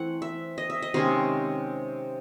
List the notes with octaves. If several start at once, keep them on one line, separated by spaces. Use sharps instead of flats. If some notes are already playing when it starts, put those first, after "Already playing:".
Already playing: E3 A3 C4 F#5
E5
D#5
E5
D#5
C3 D#3 G#3 C#4 C5